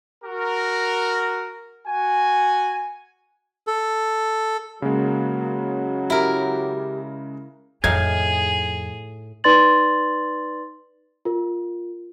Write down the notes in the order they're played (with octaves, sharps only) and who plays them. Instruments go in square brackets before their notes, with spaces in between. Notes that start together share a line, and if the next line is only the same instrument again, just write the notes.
[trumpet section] F#4 A#4
F#4 G#5
[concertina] A4
[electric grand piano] C#3 G#3 [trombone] F#3 [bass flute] A#3
[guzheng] E4 A#4 [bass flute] G4
[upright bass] F2 D#3 [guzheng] A2 D#4 F5 [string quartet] G#4 [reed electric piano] G#6
[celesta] D#4 B4 D5 C6 A6 F#7
F4 A#4